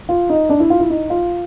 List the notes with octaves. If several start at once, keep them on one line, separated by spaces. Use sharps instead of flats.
F4
D#4
D4
E4
F4
E4
D#4
F4